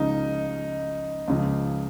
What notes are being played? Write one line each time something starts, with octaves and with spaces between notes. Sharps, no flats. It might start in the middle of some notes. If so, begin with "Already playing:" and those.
Already playing: C#2 C#3 F3 C#4 D#4 F4
C#2 C#3 F3